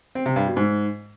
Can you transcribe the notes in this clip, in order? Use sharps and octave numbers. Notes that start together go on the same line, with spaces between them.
C4
C3
G2
B2
G#2